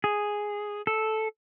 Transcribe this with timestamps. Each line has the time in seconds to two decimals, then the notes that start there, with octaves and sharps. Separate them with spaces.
0.04 G#4
0.87 A4